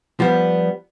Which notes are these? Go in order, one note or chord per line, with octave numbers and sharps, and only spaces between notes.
F3 G3 B3